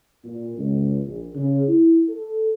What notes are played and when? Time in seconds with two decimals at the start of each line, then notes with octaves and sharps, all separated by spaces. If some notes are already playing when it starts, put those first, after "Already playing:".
0.25 A#2
0.58 C#2
1.06 A#1
1.35 C#3
1.68 E4
2.09 A4